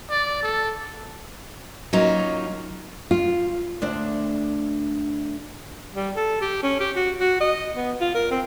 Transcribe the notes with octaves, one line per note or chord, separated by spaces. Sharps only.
D5
A4
F#3 A#3 C#4 D#4 F4
F4
D2 D4 C5
G3
A4
G4
C#4
G4
F#4
F#4
D#5
B3
F4
A#4
C4